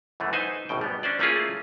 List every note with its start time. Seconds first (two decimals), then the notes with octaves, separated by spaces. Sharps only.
0.20 F#2 E3 A3
0.33 D#4 B4 C5 G#5
0.69 G#1 F#2 B2 G5
0.81 G3 B3
1.03 C#4 D4 C5 D5
1.19 A3 A#3 C#4 E4 F4 G#4